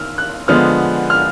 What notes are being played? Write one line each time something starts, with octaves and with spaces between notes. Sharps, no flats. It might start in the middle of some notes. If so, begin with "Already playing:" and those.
Already playing: D#3 E6 F6
F#6
D3 F3 G#3 B3 F6
F6